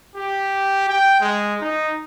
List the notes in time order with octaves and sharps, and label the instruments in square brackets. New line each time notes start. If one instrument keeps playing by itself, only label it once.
[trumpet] G4
G5
G#3
D#4